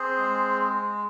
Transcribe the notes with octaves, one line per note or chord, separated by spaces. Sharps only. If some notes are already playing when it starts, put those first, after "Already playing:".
Already playing: C4 G#4 C5
G#3